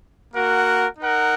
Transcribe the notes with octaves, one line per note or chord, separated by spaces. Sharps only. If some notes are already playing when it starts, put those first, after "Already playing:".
A#3 F#4 A#4 F#5
D#4 A#4 F#5